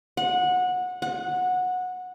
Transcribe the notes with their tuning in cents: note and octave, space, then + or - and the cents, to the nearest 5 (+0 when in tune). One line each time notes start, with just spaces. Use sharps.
F#5 -20
F#5 -15